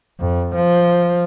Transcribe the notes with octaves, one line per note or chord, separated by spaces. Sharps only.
F2
F3